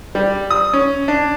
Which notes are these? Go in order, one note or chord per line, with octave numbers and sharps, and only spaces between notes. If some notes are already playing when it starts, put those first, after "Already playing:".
G3
D#6
C#4
D4